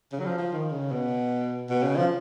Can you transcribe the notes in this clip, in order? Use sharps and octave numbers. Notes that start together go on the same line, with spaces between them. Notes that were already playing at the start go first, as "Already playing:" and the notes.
C#3
F#3
F3
F3
D#3
C#3
B2
B2
C#3
F3